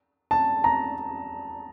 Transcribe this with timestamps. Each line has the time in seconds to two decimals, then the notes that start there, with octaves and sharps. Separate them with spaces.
0.31 A5
0.64 A#5